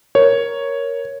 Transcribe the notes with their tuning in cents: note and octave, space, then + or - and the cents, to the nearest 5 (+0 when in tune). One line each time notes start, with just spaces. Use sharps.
A#4 +5 C#5 +0